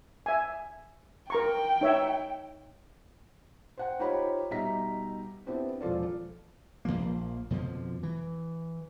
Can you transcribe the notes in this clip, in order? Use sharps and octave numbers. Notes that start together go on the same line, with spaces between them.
E5 G#5
A#4 G5 A#5 C#6
D#4 C#5 E5
C5 F#5 G5
D#4 F4 G4 C5 C#5 B5
B2 G3 D#4 E5 A#5 B6
B3 C4 D4 E4 G4 C5
E1 F3 F4 A4 D5
A#1 F#2 F3 A#3
F2 B2 D3 F3
E3